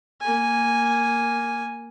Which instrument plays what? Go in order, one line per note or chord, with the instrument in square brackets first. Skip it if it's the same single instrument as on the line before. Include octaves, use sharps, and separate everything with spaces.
[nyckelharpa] A#3 G#5